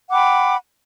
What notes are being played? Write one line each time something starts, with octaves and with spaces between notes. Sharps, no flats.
F#5 G5 B5 D6